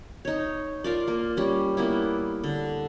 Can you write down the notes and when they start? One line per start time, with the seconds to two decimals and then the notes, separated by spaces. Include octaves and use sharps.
0.25 D#4 C#5
0.84 F4 A#4 D5
1.08 A#3
1.37 G3 C#4
1.77 A#3 B3 E4
2.44 D3